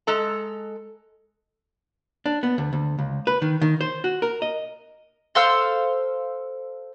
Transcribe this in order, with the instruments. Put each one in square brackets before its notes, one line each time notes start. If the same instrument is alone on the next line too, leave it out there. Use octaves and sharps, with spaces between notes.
[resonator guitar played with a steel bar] G#3 A4 A#5
[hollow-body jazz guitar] D4
B3
D2
D2
C#2
B4
D#3
D#3
C5
F#4
A#4
D#5
[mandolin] A4 C5 F5 E6